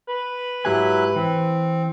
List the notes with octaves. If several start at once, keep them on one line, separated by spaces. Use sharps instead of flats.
B4
G#2 F#3 E4 G4 G#5 F#6
E3 C4